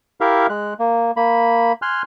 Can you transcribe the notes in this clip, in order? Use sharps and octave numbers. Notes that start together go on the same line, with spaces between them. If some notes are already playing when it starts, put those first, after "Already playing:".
E4 G4 A#4 E5 F5
G#3 F#6
A#3
A#3 B5
G#5 C6 F6 F#6